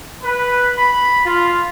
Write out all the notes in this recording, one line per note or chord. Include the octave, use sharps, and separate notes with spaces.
B4
B5
F4